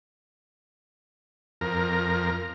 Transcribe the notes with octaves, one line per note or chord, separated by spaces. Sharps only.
F2 A#4